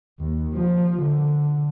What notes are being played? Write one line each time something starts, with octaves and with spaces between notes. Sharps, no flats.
D#2
F3
D3